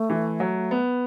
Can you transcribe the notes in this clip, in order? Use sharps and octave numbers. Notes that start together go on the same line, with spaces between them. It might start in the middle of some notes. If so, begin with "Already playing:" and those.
Already playing: A3
E3
F#3
B3